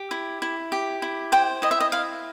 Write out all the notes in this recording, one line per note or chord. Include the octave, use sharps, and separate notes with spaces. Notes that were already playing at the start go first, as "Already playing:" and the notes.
Already playing: G4
E4
E4
G4
E4
C5 G5
E4 D#5
E5
D#5
E4 F5